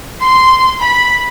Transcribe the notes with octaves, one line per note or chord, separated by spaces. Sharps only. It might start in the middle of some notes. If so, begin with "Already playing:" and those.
C6
B5